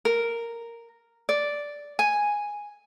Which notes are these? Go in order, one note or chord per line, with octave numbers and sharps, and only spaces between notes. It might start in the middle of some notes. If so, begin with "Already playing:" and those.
A#4
D5
G#5